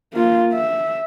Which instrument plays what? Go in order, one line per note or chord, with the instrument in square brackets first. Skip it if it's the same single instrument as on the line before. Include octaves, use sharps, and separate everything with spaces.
[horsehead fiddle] A#3 F4
E5